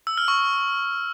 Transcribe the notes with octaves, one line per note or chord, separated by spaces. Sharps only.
E6
F6
C#6